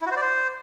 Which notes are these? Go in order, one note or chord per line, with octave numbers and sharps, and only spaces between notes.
E4
F#4
C5
D5
C5